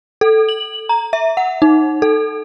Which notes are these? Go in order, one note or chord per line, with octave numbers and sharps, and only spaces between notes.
A4
F#7
A#5
E5
F#5
D#4
A4